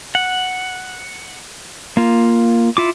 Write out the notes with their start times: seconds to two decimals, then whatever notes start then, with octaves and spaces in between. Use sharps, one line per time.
0.15 F#5
1.97 A#3 F4
2.77 E4 F4 D6